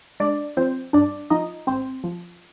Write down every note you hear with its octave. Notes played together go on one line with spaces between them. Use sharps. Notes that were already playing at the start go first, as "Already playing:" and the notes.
G#3 D4 D5
F3 C4 C5
G2 D4 D5
F3 D#4 D#5
G#1 C4 C5
F3